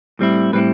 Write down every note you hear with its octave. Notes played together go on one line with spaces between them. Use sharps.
A2 G3 C4 E4
A2 G3 C4 E4 B4